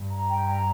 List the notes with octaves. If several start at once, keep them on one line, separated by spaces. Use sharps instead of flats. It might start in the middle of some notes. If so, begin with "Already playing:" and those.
Already playing: G2
A#5
G5
A#5